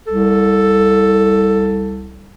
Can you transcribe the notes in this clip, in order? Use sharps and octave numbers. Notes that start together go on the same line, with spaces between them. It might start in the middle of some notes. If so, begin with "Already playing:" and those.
C2 A4